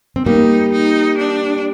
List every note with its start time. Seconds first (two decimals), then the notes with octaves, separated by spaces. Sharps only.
0.16 C4
0.26 G3 A#3 D#4
0.73 D#4
1.18 D4